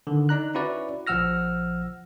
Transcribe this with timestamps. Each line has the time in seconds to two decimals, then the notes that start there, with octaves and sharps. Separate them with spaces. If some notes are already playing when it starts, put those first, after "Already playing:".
0.07 D3 D#3
0.29 D#4 D5 A#5 F#6
0.55 C#4 E4 F#4 B4 D5
1.07 A#1 F3 F#5 E6 F6 A#6